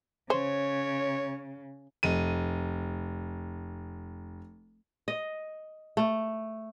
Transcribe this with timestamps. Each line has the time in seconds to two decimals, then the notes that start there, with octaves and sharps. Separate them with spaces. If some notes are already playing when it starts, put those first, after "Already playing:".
0.30 C#3 C5 C#5
2.03 F1 D#7
5.08 D#5
5.97 A3